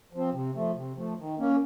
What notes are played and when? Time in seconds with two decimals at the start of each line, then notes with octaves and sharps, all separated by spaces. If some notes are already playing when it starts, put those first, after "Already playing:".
0.13 F3 C4
0.34 C3
0.55 F3 A3
0.76 C3
0.97 F3 A3
1.18 D#3
1.39 A#3 C#4